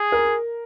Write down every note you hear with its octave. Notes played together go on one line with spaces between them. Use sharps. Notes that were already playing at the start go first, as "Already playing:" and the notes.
Already playing: G#4
A#4